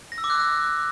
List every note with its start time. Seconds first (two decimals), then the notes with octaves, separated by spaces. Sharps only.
0.12 A#6
0.18 E6
0.24 D6
0.30 F#6